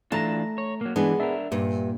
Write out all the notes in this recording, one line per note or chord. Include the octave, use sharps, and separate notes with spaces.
E3 A3 D4 F4 A5 A#5 A#6
C#5
F#3 A#3
E3 G#3 B3 D4
D4 A#4 E5
G2 A#2